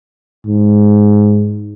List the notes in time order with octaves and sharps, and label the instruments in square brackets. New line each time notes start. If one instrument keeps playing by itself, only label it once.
[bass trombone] G#2